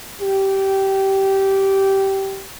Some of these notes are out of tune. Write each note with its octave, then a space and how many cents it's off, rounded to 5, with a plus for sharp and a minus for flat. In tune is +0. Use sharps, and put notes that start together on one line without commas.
G4 -15